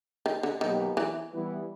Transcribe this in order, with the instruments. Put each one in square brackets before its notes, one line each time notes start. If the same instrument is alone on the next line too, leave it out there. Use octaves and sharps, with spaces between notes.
[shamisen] D#3
D3
[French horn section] B2 F#3 A#3 D#4 G4 [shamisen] D#3
[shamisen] E3
[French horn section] E3 G3 B3 E4